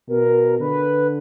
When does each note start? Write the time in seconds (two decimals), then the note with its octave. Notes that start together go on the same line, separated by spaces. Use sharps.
0.08 B2 A#4
0.60 D3 B4